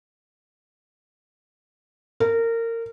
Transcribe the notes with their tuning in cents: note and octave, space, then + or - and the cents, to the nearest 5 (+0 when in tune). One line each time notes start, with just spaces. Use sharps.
A#4 -25